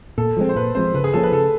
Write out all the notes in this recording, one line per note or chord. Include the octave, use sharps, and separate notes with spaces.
A#2 A4
F3 G#3 C4
C5
A#2 B4
F3 G#3 C4 C5
C#3 B4
G#4
F3 A#3 C#4 A4
B4
C#3 A4